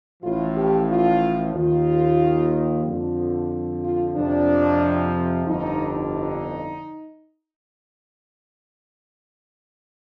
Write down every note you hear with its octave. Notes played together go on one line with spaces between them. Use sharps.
A1 A2 F3 F4
G4
F4
D#2 D#3 F4
F2 D3 F3
F4
F2 C3 F3 D4
G1 F2 D3 D#4
D#4